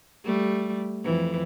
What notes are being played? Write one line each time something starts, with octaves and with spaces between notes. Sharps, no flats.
G3 A3
F2 E3